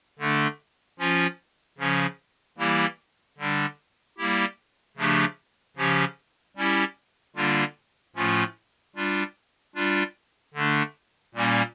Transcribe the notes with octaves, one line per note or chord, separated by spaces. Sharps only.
D3 A3 D4
F3 C#4 F4
C#3 F3 C#4
E3 G3 A#3 E4 G4
D3 G3 D4
G3 A#3 E4 G4
C#3 F3 A3 D4 G4
C#3 F3 C#4 G4
G3 C#4 E4 G4
D3 G3 A#3 D4 F4
A2 F3 A3 C#4 F4
G3 D4 F4
G3 D4 F4
D3 A3 D4
A#2 G3 A#3 C#4